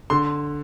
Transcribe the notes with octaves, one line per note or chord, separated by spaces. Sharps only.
D3 C6